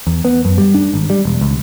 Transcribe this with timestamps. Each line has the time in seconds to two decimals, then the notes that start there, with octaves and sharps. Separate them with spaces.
0.07 E2
0.25 B3
0.45 F#2
0.58 G3
0.74 D4
0.94 G#1
1.10 G3
1.25 E1
1.41 C#2